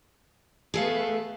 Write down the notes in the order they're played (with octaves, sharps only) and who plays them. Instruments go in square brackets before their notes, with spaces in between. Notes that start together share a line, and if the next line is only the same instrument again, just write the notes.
[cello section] A3 B3 B4 [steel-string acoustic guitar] G#4 A4 F5